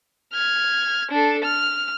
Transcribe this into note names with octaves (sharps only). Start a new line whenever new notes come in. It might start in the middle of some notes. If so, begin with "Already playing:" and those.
F6 G#6
D4 A4
F6